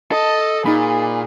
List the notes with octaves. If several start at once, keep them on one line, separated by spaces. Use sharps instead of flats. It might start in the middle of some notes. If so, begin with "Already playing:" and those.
A4 D#5
A#2 D#4 G#4 B5